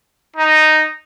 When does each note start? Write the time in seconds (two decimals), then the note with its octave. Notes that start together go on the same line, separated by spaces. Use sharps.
0.36 D#4